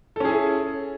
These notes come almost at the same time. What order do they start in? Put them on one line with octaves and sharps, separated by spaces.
A4 C#4 G#4 E4